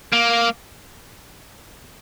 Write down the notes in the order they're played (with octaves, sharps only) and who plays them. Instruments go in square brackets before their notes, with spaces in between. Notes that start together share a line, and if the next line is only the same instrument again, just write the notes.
[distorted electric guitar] A#3